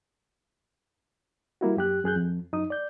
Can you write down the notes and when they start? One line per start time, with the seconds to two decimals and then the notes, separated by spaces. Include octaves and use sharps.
1.61 G3 A#3 E4 F#4
1.77 F#2 G4 F#6
2.04 F#2 G#4 F#6 G6
2.16 F2
2.52 F#2 D#4 D#6
2.70 D5 G6